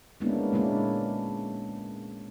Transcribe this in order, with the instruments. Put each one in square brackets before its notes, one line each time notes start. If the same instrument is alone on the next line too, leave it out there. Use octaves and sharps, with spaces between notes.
[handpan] G#3 A#3 B3 C#4 D4 E4
A#2 G#3 A#3 C#4 D4 E4